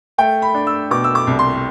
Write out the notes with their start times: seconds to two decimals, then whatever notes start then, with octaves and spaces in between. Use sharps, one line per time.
0.18 A3 G5
0.42 B5
0.54 D4
0.67 E6
0.91 B2 D6
1.04 E6
1.15 D6
1.27 C2
1.39 C6